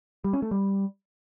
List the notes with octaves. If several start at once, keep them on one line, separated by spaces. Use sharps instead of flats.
G3
C#4
A3
G3